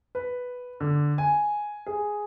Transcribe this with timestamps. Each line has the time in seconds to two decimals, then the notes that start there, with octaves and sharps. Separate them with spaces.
0.15 B4
0.80 D3
1.18 G#5
1.86 G#4